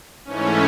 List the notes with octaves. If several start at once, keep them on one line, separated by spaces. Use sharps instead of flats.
G#2 E3 A3 C#4